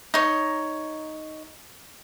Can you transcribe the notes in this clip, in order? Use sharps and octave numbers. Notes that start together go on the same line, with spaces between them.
D#4 C#5